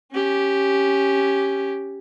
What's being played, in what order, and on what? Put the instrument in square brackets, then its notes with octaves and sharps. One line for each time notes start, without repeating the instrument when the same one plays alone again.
[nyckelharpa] C#4 G4